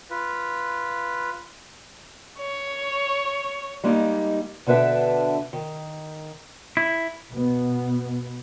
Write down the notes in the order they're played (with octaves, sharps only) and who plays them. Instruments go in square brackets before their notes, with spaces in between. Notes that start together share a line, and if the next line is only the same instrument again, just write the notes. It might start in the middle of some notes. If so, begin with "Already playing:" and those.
[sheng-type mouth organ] F4 B4
[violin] C#5
[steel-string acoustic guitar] G3 G#3 A#3 D#4
B2 D3 D4 B4 E5
D#3
[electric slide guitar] E4
[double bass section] B2 B3